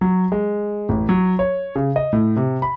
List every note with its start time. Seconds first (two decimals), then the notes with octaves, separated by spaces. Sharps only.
0.01 F#3
0.32 G#3
0.89 A1
1.09 F#3
1.39 C#5
1.75 C#3
1.96 D#5
2.13 A2
2.36 C3
2.62 B5